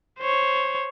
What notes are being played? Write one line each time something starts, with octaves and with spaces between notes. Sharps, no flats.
C5 C#5